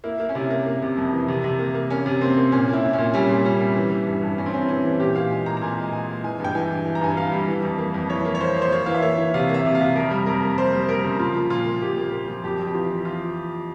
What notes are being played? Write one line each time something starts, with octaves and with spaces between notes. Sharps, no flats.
A#3 E4
A#3
C#4
C3 E4
A#3
A#3
C3
F2
E3
C3
C3
A#3
A#3
A#3 C#4
C3
A#3 C4
A#3
A#2 C#4
A#3
E4
A#2
C#4
A#2
G3 C#4
A#2
G3 C#4
G3
E3
E3
G2
G2
G2 C#4
C4
E3 C#4
E3 C#4
E3
A#2 G4
A#2 F5
G#3 G#5
A#2 A#5
A#5
A#2 G#5
G#3
G#3 G#5
G#3
E3 G#5
G2 G5
E3 G#5
G2
E3 G#5
A#5
G2 G#5
E3 F5
G3
E3
F2
A#3
F2
E3 C#5
A#3
C#5
A#3 C5
A#3
C5
A#3 C#5
E3 F5
E5
A#3 C#5
E3
C3 F5
A#3
E5
C3
F5
C3
F2 A#4
G3
F2 A#4
A#3
G3 C5
G3
A#3 A#4
C#3
F3 F4
A#3
A#2 F4
A#3
A#2 G4
A#3
A#3
F3
F2 G4
F2
G4
E3 F4
E3
F4